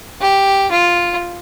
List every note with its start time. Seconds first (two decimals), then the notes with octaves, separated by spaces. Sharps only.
0.21 G4
0.71 F4